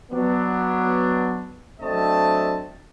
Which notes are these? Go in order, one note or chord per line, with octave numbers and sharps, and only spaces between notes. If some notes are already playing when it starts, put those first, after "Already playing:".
F#3 B3 D4
F#3 A3 C4 D4 D#5 A5